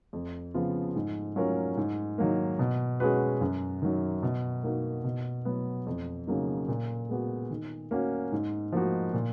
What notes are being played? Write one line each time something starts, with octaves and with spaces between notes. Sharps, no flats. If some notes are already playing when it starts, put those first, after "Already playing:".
F2
C#3 F3 B3 F4
G#2
F#3 C#4 F4 A#4
G#2
D#3 F#3 A#3
B2
G#3 C#4 F#4 B4
F#2
D#3 F#3
B2
A#3 D#4 F#4 A#4
B2
F#3 B3
F2
C#3 F#3 A#3 D#4
A#2
G#3 B3 F#4
D#3
A#3 C#4 F#4
G#2
F3 A#3 D#4 F#4
A#2